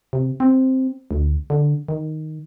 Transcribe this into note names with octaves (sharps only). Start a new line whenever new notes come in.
C3
C4
D2
D3
D#3